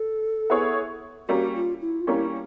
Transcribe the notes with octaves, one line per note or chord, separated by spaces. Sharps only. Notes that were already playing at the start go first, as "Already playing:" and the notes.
Already playing: A4
B3 E4 G#4 C#5
G3 A#3 C#4 F#4
F4
E4
F4
G3 A#3 C#4 E4